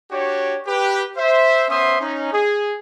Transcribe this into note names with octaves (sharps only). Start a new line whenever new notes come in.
D4 F#4 G4 C#5
G4 B4
C5 E5
B3 C#4 C5 E5 C6 D#6
C#4 D#4
G#4